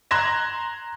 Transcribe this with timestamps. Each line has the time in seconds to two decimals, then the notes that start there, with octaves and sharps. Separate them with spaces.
0.11 A#5 C6 F#6 G#6 A#6 E7